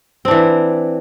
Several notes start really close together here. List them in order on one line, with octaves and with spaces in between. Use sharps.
C4 D4 E3